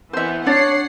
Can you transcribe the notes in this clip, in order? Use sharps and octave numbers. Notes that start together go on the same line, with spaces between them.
E3 B3 C5 E5
D4 C#5 D5 F#5 C7